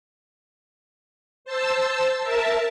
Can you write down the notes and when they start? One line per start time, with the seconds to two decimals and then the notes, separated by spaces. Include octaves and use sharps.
1.45 C5 A5 E6
2.23 A#4 E5 A5